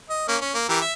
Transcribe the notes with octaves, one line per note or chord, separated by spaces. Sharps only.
D#5
A#3 C#4
C#4
A#3
E3 G4 A#4
E5